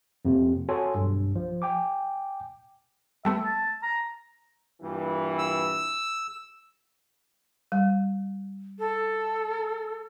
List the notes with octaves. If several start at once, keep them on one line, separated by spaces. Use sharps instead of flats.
F2 C3 A#3
F#4 A4 C#5 G#5 C6
B1 G2
F3
G5 G#5 D6
G3 A3 B3 E5
A5
A#5
G2 A#2 E3
E6
G3
A4